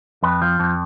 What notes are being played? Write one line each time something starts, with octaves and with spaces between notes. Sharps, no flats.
F2 B4
F3
F2